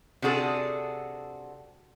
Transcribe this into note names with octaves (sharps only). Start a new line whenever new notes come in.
C3 D4 F#4 G#4 A4